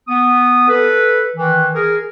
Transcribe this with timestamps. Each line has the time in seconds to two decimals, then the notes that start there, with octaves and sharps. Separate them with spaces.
0.08 B3 D#6
0.68 A4 B4
1.36 D#3 E3
1.74 G#4 A#4